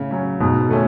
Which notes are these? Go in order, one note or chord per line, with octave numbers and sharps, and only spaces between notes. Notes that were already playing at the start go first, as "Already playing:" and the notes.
Already playing: A2 C#3
F#3 C#4
G#2 B2
D#3 A3 C#4